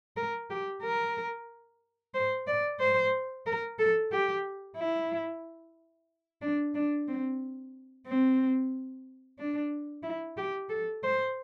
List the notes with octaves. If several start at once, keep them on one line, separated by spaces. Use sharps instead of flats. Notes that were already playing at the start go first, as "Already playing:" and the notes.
A#4
G4
A#4
C5
D5
C5
A#4
A4
G4
E4
D4
D4
C4
C4
D4
E4
G4
A4
C5